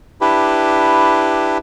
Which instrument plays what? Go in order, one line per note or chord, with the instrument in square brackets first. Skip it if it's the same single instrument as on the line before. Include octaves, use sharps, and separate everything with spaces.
[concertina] D4 E4 G4 B4